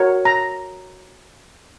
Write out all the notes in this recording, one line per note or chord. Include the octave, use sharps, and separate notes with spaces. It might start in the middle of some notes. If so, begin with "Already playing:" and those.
Already playing: F#4 A#4 C#5
A#5